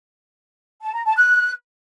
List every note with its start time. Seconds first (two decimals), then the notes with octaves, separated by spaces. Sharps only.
0.82 A5
0.94 A#5
1.05 A5
1.17 F#6